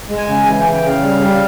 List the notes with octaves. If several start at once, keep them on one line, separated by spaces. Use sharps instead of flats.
G#3
G#5
C#3
E3 G#5
C#3 G5
G5
C#3 F5
G3
G3